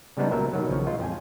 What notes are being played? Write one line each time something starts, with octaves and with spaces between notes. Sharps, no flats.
C#3 G3 G#3 B3 D4 D#4
C#2 A#2 F#3 A#4 E5
B2 D#3 F#3
A#1 C#3 F3 C#5
G#3 F4 D#5
F2 G5 G#5